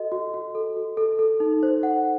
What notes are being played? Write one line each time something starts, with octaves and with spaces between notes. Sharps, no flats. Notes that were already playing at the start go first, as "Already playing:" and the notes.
Already playing: F#4 A4 D#5
F#4
F#4
A4
F#4
A4
A4
D#4
C5
F#5